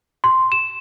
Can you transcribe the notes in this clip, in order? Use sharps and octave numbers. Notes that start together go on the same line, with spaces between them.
C6
E7